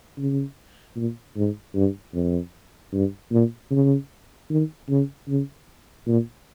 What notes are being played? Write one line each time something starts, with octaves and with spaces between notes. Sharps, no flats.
C#3
A#2
G#2
G2
F2
G2
A#2
C#3
D#3
C#3
C#3
A#2